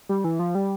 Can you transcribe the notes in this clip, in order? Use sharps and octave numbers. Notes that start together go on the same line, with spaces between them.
G3
E3
F3
G3